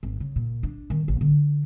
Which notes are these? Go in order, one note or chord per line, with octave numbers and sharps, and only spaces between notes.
G#1
C#3
A#2
D4
D#3
A1
D3